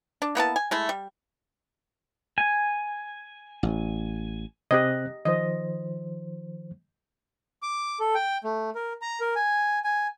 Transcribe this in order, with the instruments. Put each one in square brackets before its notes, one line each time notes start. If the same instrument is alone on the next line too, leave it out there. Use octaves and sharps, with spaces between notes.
[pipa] D4
A#3 B3 E4 A5
G#5
G#3 A3 E4
G3
[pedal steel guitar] G#5
[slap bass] A1
[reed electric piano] C3 C4 F#6 [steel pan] G4 D#5
[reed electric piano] D#3 F3 C5 [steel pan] D#5
[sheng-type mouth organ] D6
A4
G5
A3
A#4
A#5
A#4
G#5
G#5